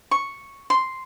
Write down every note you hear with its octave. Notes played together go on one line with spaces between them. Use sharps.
C#6
C6